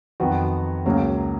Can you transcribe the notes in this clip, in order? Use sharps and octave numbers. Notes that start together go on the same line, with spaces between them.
F2 D#3 F#3 B3 F#4
C#2 C#3 F#3 A#3